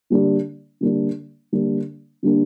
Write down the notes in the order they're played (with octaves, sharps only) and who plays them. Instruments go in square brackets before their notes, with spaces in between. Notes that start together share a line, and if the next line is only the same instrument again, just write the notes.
[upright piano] D3 G3 A#3 D4
D3 G3 A#3 D4
D3 G3 A#3 D4
D3 G3 A#3 D4